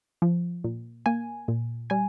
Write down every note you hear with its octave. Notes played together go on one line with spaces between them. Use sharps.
F3
A#2
A#3 G#5
A#2
G3 G#5